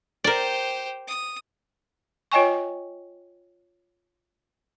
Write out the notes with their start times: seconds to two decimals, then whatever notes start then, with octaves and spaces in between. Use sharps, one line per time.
0.24 G4 A#4 C5 D5
1.07 D#6
2.32 F4 C#5 D#5 G5 G#5 C#6